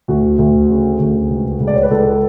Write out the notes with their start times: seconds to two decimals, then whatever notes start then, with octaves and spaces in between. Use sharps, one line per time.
0.08 D2 F#4
0.39 D2
0.69 C#3
1.00 D2
1.30 C#2
1.60 C#2
1.67 D5
1.75 C#5
1.83 B4
1.91 C#2 A4